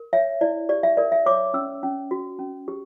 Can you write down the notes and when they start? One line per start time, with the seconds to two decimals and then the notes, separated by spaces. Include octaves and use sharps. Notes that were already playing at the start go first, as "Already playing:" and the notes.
Already playing: A#4
0.13 C#5 E5
0.41 E4 D5
0.69 G4 D5
0.83 E5
0.97 A#4 D5
1.12 E5
1.26 C#5 D6
1.54 C#4 E6
1.83 C#4
2.11 F#4
2.39 C#4
2.68 G4